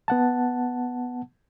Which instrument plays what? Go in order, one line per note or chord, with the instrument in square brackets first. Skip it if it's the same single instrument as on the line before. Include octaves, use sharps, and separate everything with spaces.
[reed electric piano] B3 F#5 A5